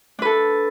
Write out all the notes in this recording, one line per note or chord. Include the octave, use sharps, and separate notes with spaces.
D4 A4 B4